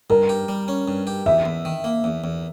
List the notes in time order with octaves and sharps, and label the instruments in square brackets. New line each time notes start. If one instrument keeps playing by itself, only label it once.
[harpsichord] G2 [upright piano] A#4
[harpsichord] G4
G3
C#4
G2
G4
[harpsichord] E2 [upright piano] E5
[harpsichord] E2
D#3
A#3
E2
E2